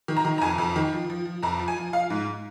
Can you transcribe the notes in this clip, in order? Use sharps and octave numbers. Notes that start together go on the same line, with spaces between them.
D#3
A#5
D#3
A#5
F2 G#5
F2
D#3
F3
F3
F3
F2 A#5
F3
G#5
F3
F3 F5
G#2